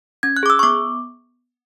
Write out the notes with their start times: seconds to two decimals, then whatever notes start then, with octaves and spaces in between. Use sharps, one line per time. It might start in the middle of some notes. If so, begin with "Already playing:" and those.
0.23 C#4 G#6
0.37 F#6
0.43 G#4 D6
0.50 E6
0.59 C#6
0.63 B3 D6